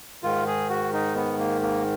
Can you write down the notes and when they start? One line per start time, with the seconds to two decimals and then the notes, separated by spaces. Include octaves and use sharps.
0.23 G#2 D#3 F4
0.47 G#4
0.69 F#4
0.93 D#4
1.15 B3
1.39 A#3
1.62 A#3